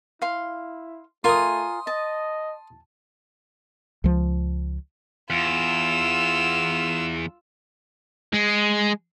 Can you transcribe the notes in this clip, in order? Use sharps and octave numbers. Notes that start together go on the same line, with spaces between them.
E4 F5 C6
A3 F4 A#4 G#5 C6 D#6
D#5 A5
C#2 F3
E2 F4 E6
G#3